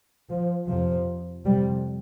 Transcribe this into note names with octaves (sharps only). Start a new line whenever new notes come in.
F3
F2 C3 F3
F2 C3 G3